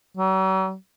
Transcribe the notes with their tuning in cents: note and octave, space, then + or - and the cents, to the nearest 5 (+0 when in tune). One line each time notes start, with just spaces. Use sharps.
F#3 +45